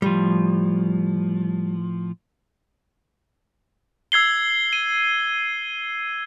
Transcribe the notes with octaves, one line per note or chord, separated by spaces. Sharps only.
A2 F3 G3
E6 G#6 C7 G7
D#7